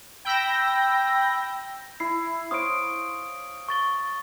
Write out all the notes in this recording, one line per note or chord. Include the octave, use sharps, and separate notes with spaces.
G5 B5 E6 G6 A#6
E4 C7
C5 C#5 F5 D#6 D7
C#6 A6 G7